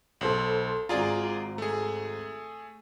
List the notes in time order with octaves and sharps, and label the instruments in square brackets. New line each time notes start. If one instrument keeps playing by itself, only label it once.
[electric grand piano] B1 [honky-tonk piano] A4 C5 F#7
[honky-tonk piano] G#1 A#5 [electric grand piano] F4 G#4 D5
[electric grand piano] A3 G#4